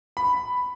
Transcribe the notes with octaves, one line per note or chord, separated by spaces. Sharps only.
B5